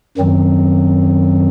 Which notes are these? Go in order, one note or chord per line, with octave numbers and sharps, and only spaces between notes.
F#2 D#3 F#3 C4